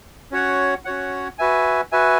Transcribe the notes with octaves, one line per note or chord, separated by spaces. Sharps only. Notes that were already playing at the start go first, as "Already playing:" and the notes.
C#4 F#4 C#5 F#5
C#4 F#4 C#5 F#5
F#4 B4 E5 G#5
F#4 B4 E5 G#5